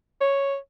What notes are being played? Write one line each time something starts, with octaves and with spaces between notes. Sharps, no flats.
C#5